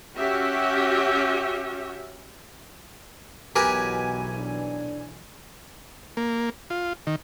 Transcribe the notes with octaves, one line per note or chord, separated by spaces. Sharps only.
C#4 F#4 G4 E5
B1 B2 E3 F#3 G4 A#4 B4 G#5
D4
A#3
F4
D#3